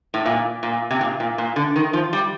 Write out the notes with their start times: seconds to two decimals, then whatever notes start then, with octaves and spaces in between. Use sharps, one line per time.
0.14 A2
0.26 A#2
0.63 A#2
0.91 C3
1.01 A#2
1.20 A#2
1.38 A#2
1.56 D3
1.76 D#3
1.93 F3
2.13 G3